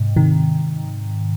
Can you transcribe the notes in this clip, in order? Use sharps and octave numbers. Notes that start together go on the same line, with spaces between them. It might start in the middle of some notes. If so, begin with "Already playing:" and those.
Already playing: G#2 C3
C3 D#3